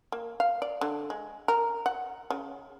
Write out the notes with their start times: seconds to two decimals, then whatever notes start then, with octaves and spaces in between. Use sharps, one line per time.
0.12 A#3
0.40 F5
0.62 D5
0.81 D3
1.10 G#3
1.48 A#4
1.86 F#5
2.30 C#3